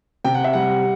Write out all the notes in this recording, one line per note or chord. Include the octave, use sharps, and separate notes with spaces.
C3 G5
F#5
E5
G3 F#5